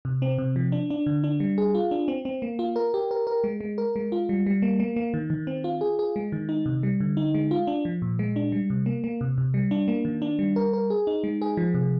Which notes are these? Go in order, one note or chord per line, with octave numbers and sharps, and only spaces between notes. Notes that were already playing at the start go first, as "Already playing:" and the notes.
C3
C4
C3
F3
D4
D4
D3
D4
G3
G#4
F4
D4
C4
C4
A#3
F4
A#4
G4
A#4
A#4
G#3
G#3
A#4
G#3
F4
G3
G3
A#3
A#3
A#3
D#3
D#3
C4
F4
G#4
G#4
G#3
D#3
D#4
C3
G3
D3
D#4
G#3
F4
D4
F3
A#2
G#3
D4
G3
C3
A#3
A#3
C3
C3
G3
D4
A#3
D#3
D4
G3
A#4
A#4
G#4
D#4
G#3
G#4
F3
C3